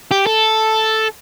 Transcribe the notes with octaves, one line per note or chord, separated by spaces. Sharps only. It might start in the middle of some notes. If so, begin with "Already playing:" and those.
G4
A4